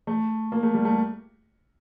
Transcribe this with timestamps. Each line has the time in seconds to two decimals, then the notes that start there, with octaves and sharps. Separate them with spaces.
0.07 A3
0.52 A#3
0.63 A3
0.74 G3
0.85 A3